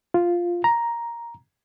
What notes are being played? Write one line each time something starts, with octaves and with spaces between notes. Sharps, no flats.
F4
A#5